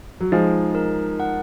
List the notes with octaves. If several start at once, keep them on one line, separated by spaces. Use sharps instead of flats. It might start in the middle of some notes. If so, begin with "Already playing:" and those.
F#3
F3 G#3 D#4
A#4
F#5